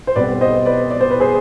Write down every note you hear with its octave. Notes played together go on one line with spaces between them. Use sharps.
C5
B1 B2 G3 C4 B4 D5
C5 D#5
B4 D5
D5
C5
B4
G#4 C5